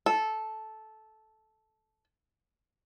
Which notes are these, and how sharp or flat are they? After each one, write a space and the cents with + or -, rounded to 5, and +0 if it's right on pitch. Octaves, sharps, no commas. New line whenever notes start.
A4 -10